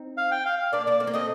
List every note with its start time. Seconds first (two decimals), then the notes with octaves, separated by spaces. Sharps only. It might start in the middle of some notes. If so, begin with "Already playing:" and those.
Already playing: C4 D#4
0.17 F5
0.31 G5
0.45 F5
0.59 F5
0.73 A#3 D4 D5
0.86 A#3 D4 D5
1.00 A3 C4
1.07 A#3
1.14 A3 C4 D#5